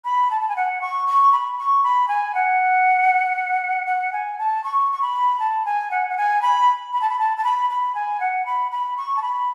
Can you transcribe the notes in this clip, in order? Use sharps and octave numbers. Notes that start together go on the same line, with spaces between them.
B5
A5
A5
G#5
F#5
C#6
C#6
B5
C#6
B5
G#5
F#5
F#5
G#5
A5
C#6
C#6
B5
A5
G#5
F#5
F#5
G#5
B5
B5
A5
B5
A5
A5
B5
B5
G#5
F#5
B5
B5
C#6
A5
B5